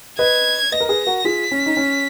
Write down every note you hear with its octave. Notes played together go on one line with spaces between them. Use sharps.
B4 D#5 G#6
B4 D#5 A#6
A#4
G#4 B4
F#4 A#4
F4 G#4 B6
C#4
D#4
C#4